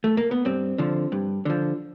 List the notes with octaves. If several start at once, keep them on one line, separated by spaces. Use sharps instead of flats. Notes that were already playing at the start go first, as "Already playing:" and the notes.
A3
A#3
B3
G2 C4
D3 F3
G2
D3 F3